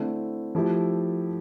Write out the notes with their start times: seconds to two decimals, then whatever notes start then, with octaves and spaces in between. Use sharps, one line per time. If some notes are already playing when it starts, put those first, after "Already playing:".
Already playing: D3 A3 C4 E4
0.55 F3 A3 E4 G4